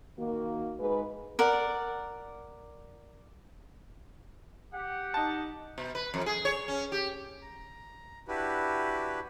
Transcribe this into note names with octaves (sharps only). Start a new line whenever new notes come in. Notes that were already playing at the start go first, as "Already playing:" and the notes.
D#3 A#3 F#4
G#2 B4
A#4 D5 F#5
G4 F#5
D#4 A5
B2
B4
F2
G#4
C#5
C#4
G4
A#5
D4 E4 F#4 G4 B4